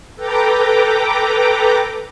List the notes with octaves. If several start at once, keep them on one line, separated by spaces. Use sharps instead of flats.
A4 B4 G5 A#5 D6